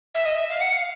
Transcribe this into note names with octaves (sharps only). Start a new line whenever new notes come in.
E5
D#5
E5
F5
F#5
F5